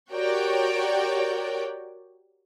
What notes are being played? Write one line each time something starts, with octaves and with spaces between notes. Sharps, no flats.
F#4 G4 A#4 C#5 D5 G5